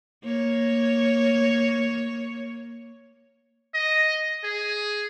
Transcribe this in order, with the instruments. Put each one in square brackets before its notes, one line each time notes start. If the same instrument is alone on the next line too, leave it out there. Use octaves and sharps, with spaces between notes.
[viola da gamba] A#3 C#5
[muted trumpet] D#5
G#4